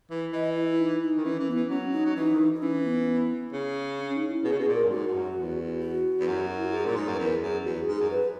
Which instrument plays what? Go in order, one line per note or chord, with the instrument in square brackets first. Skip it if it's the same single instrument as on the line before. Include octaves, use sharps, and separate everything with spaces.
[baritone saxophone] E3
[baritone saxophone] E3 [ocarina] D#5
[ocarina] E4
D#4
D#4
[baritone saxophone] D#3
[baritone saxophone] E3 [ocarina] C#4
[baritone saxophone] E3
[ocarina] B3
[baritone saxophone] E3
[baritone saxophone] F#3 [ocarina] C#4
[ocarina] D#4
[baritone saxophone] F#3
[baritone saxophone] E3 [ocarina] D#4
[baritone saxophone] D#3
E3
[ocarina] D#4
[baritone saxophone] E3 [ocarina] C#4
[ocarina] B3
[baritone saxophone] C#3
[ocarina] C#4
D#4
E4
[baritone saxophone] B2 [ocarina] G#4
[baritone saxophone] C#3
[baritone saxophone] B2 [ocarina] G#4
[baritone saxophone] A#2
[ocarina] A#4
[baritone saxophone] F#2
[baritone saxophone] G#2 [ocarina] F#4
[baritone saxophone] G#2
F#2
E2
[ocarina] F#4
[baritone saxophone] E2
F#2
[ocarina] E4
F#4
G#4
[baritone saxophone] A#2
G#2
[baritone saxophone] F#2 [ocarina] B4
[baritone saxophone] E2 [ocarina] A#4
[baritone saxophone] F#2 [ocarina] G#4
[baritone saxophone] E2 [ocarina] F#4
[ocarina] G#4
[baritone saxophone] G#2
[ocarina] G#4
[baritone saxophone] F#2
[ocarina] B4